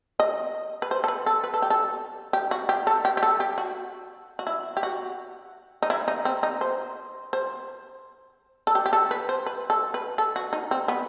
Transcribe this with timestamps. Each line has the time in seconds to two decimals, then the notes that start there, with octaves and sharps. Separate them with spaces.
0.20 D#5
0.82 B4
0.91 C5
1.04 A4
1.08 B4
1.26 A4
1.44 B4
1.54 A4
1.62 G4
1.70 A4
2.33 G4
2.51 F#4
2.69 G4
2.87 A4
3.05 G4
3.17 G4
3.23 A4
3.40 G4
3.58 F#4
4.39 F#4
4.47 E4
4.77 G4
4.83 F#4
5.83 D#4
5.90 E4
6.08 D#4
6.25 C4
6.43 D#4
6.61 C5
7.33 C5
8.67 A4
8.75 G4
8.86 G4
8.93 A4
9.11 B4
9.29 C5
9.46 B4
9.70 A4
9.94 B4
10.18 A4
10.36 F#4
10.53 D#4
10.71 C4
10.88 B3